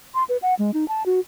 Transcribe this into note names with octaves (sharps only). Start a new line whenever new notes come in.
C6
B4
F#5
G#3
D#4
A5
F#4